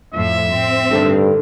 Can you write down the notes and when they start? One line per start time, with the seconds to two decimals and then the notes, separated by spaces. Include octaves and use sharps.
0.14 F2 A2 F3 E5
0.51 A2 C4
0.91 G2 D3 D#3 A3